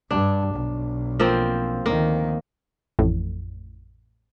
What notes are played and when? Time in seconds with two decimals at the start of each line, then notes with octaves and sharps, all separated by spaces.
0.11 G2 D4
0.55 B1
1.20 F3 A#3 C4
1.86 D2 D#3 A#3
2.99 A1 F2 A2